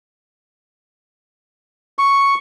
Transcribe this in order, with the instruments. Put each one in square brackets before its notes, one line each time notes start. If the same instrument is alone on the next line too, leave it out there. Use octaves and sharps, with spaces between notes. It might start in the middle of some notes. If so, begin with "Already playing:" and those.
[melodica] C#6